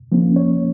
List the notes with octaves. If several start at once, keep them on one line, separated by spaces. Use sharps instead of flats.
F3 A#3 C#4
C#5